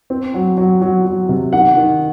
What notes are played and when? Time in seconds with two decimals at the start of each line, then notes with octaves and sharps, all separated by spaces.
0.10 C4
0.34 F#3
0.58 F#3
0.82 F#3
1.05 F#3
1.29 C3
1.53 D#3 F#5
1.77 D#3